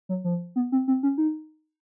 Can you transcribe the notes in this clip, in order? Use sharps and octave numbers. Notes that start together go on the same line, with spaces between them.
F#3
F3
B3
C4
C4
C#4
D#4